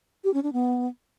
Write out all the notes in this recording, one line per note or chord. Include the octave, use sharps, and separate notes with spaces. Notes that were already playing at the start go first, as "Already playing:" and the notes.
G4
C#4
D4
B3